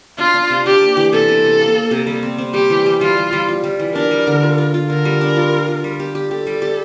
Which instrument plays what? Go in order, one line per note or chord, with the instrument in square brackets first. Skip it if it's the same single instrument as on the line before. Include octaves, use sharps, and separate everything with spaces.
[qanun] D4 [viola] F4
[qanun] D4
C3
[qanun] D4 [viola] G4
[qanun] A#3
E3
[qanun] C3 [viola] A4
[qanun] C3
C3
A#3
A#3
C3
G3
C4
C4
[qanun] G3 [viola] G4
[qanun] E3
G3
[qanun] G3 [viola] F4
[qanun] G3
G3
F4
G3
E3
[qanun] D4 [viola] A#4
[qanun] G3
D3
F4
F4
F4
[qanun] D3 [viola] A#4
[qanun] G3
D4
F4
F4
F4
G3
G4
G4
[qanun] G4 [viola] A4
[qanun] G3
G4